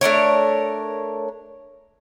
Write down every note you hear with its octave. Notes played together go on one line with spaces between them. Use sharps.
A3 D4 A#4 C#5